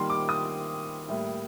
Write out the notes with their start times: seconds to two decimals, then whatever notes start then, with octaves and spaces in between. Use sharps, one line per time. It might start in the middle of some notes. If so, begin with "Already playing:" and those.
Already playing: D#3 G3 A#3 C6
0.10 D6
0.29 D#6
1.09 A2 G3 A#3